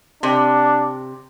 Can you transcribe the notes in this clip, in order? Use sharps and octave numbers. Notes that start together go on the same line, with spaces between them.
C3 D4